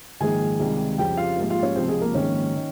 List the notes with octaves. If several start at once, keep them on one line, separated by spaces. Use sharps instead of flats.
A#1 G#2 D#3 G#4 G#5
C#2 C3 D#3 G3
F2 C#3 G3 G4 G5
F4 F5
A#1 G#2 G3
F4 F5
C#4 C#5
C#2 C3 F3 C4 C5
G#3 G#4
A#3 A#4
A#1 G#2 D#3 C#4 C#5
D#3